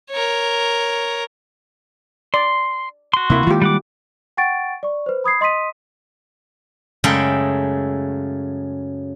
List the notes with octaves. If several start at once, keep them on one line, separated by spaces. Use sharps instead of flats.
A#4 C#5
D5 C6
F#4 C6
D2 C3 A#3 E4
D#3 G#3 A#3 F4 G4
G3 F#5 D6
F#5 G5 C#6 A6 D7
D5 C#6
B4 C5
B5 D#6 G#6 C7
D#5 C6 D#6 B6 D#7
F#2 C#3 G#3 A3 A4 G5